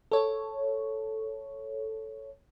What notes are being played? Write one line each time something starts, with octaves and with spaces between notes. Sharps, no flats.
A4 C#5